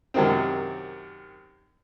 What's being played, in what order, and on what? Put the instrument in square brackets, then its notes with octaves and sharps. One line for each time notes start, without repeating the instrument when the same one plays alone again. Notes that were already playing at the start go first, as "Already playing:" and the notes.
[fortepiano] F#2 C3 D#3 C4